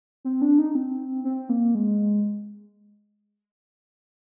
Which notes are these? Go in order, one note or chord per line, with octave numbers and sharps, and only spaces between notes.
C4
D4
D#4
C4
C4
A#3
G#3